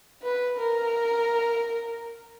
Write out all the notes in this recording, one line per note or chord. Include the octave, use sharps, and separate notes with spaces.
B4
A#4